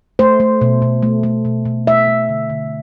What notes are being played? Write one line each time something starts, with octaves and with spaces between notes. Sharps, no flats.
A3 C5
A3
B2
B2
A3
A3
B2
B2
A3 E5
A3
D3
D3